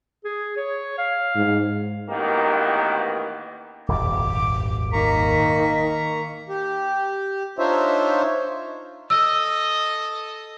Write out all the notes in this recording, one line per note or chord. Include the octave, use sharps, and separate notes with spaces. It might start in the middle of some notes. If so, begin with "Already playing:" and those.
G#4
C#5
F5
G#2
A1 D#3 A#3 B3 F#4 G4
D#1 G#1 F2 D6
D#3 A#3 A#5 C#6 B6
G4
D4 D#4 F4 C5 C#5 E5
A4 D#5 E6